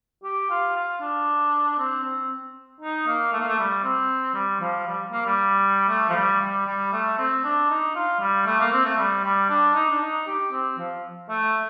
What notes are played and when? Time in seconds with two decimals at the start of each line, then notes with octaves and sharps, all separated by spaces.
0.24 G4
0.50 F4
0.76 F4
1.01 D4
1.79 C4
2.03 C4
2.80 D#4
3.07 A#3
3.33 A3
3.40 A#3
3.48 A3
3.58 G3
3.83 C4
4.35 G3
4.61 F3
4.87 G3
5.12 A#3
5.25 G3
5.89 A3
6.10 F3
6.15 G3
6.41 G3
6.66 G3
6.93 A3
7.18 C4
7.44 D4
7.70 D#4
7.95 F4
8.20 G3
8.46 A3
8.60 A#3
8.73 C4
8.85 A3
8.98 G3
9.24 G3
9.50 D4
9.75 D#4
9.90 D4
10.01 D#4
10.27 G4
10.52 C4
10.78 F3
11.29 A3